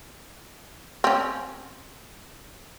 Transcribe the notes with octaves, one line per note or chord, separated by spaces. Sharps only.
C4 C#4